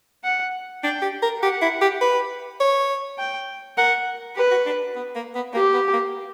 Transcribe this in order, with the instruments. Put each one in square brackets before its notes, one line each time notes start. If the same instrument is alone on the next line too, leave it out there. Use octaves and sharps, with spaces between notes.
[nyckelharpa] F#5
[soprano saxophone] D4 [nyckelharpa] G5
[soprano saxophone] G4
A#4
[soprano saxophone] G4 [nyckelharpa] F#5
[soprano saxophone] E4
G4
B4
C#5
[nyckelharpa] G5
[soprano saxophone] A#4 [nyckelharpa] F#5
[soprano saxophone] G4 [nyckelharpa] B4
[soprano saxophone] F#4
D4
B3
A#3
B3
[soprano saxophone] A#3 [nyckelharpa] G4
[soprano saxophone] B3
A#3